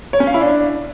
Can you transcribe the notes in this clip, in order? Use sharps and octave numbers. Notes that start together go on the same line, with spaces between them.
C#5
C#4
F5
E4
D4